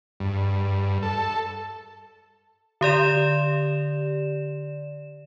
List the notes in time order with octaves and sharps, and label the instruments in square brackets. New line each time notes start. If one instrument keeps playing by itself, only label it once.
[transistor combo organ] G2
A4
[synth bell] D3 G4 D5 E7